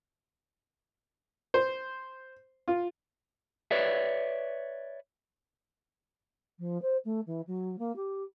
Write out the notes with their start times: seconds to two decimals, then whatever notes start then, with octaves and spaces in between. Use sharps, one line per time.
1.54 C5
2.68 F4
3.71 B4 C#5 D5 E5
6.59 F3
6.82 C5
7.05 A3
7.26 E3
7.47 F#3
7.79 A#3
7.96 G4